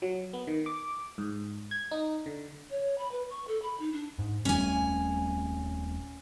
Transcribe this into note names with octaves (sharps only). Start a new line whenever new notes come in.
F#3
B3
D#3
D6
G#2
G#6
D#4
D3
C#5
B5
B4
C#6
A4
B5
D#4
D4
G#2
D#1 G3 A3 C#4 G#5